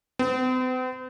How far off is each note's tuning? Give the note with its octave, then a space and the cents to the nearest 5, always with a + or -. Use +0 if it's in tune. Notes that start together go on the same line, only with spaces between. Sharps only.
C4 -45